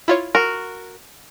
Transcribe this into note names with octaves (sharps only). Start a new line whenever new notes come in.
E4 F4 C#5
F#4 A#4